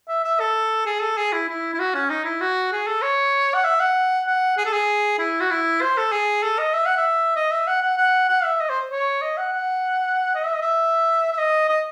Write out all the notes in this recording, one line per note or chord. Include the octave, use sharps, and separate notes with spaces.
E5
E5
A4
G#4
A4
G#4
E4
E4
E4
F#4
C#4
D#4
E4
F#4
G#4
A4
C#5
F#5
E5
F#5
F#5
G#4
A4
G#4
E4
F#4
E4
C5
A4
G#4
A4
D#5
E5
F#5
E5
D#5
E5
F#5
F#5
F#5
F#5
E5
D#5
C5
C#5
D#5
F#5
F#5
D#5
E5
D#5
E5
E5
D#5
D#5